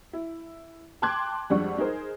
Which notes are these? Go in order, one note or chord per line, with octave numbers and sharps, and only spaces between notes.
E4
G5 A5 C6 D6 F#6 G#6
F2 G3 G#3 D4 F#5 C#6
D#4 G#4 A#4 C5